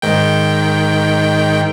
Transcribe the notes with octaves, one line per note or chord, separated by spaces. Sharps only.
G#2 D#3 G5